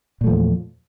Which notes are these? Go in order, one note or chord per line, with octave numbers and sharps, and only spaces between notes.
E2 A#2 F3 A3